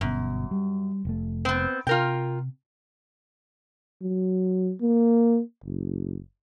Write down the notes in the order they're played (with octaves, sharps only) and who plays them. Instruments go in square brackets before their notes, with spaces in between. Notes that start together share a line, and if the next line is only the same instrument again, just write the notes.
[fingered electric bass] G1 B2 [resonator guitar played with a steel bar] F#2
[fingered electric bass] G3
F1 A3
[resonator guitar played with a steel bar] B3 C4
[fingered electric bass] C3 [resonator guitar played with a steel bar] F4 A#4 G5
[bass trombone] F#3
A#3
F#1